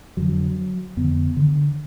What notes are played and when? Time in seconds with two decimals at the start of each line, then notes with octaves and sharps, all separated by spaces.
0.17 F2 D3 F#3
0.97 F2 D3 B3
1.37 D3